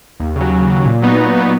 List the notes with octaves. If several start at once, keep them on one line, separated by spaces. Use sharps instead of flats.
D#2
C#3
F#3
D#2
C#3 F#3
A#2
F#3 B3 D#4
A#2
F#3 B3 D#4